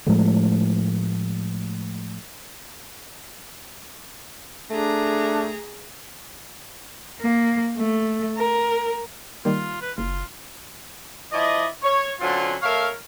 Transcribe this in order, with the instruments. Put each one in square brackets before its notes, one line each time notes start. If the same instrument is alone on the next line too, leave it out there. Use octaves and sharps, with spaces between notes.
[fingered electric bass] A2 F3 G#3 A3
[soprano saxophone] A3 [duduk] D4 [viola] G#4 A#5
[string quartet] A#3
A3
A#4
[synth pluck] D#3 G3 A#3 [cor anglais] F4
[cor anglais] B4
[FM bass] F#1 [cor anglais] F4
[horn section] F3 E4 D5 D#5
C#5
D3 F#3 C4 C#4 F4
A3 A#4 C#5 E5 F5